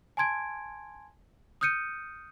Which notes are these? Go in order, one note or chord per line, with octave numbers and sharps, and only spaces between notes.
G#5 A5 C6 G#6 D7
D#6 F6 G6 C#7 D#7